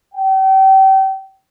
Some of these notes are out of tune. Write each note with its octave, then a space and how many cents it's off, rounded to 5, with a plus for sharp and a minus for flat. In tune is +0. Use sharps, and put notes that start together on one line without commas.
G5 -35